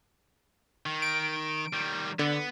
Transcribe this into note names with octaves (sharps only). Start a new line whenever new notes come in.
D#3
D7
D#3 G3
D3 B3